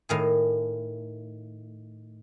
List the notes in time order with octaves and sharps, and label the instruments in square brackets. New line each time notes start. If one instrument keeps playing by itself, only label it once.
[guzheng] A2 D#3 G#4